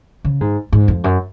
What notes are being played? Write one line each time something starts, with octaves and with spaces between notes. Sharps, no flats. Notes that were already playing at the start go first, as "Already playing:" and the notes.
C#3
G#2
G#2
F2
F#2